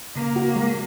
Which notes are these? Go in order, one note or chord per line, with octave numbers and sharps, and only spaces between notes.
C#3 A#3
F#4
G#3